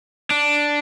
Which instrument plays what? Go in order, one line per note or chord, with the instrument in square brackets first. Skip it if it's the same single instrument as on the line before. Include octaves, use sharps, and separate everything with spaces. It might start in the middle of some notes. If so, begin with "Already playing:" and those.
[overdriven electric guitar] D4